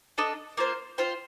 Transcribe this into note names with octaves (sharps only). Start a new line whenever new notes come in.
D4 A4 D#5
A#3 F4 C5
F4 C5 G5